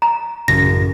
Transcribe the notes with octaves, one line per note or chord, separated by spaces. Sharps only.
A#5
A1 F#2 C#3 A#6